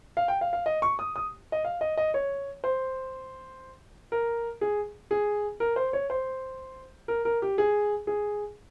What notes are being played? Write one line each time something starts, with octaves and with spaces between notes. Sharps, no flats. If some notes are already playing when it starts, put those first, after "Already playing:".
F5
G5
F5
F5
D#5
C#6
D#6
D#6
D#5
F5
D#5
D#5
C#5
C5
A#4
G#4
G#4
A#4
C5
C#5
C5
A#4
A#4
G4
G#4
G#4